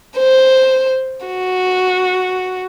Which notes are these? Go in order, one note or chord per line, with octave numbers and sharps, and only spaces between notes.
C5
F#4